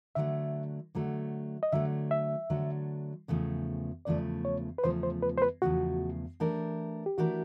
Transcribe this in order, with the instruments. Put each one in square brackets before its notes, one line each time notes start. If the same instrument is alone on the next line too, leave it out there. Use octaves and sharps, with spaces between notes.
[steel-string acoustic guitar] D3 F#3 A3 [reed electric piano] E5
[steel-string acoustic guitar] D3 F#3 A3
[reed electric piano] D#5
[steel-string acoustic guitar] D3 F#3 A3 [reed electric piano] E5
[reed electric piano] E5
[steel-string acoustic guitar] D3 F#3 A3
E2 C#3 F3 A3
[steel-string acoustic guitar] E2 C#3 F3 A3 [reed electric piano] D5
[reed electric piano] C#5
B4
[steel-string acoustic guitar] E2 C#3 F3 A3 [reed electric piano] C5
[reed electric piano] C5
B4
C5
B4
[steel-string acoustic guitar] E2 C#3 F3 A3 [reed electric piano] F#4
[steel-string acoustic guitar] E3 A3 D4 G4 A#4
[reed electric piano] G4
[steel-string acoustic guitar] E3 A3 D4 G4 A#4 [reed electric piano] F#4